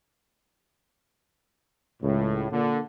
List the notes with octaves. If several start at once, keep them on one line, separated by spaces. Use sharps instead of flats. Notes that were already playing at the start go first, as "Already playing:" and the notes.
C#2 A2
A#2 D3